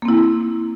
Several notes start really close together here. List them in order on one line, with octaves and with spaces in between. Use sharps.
A#3 C4 E4